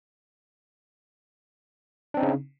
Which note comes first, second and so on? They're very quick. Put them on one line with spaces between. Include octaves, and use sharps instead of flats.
D4 C4 D#4 C#3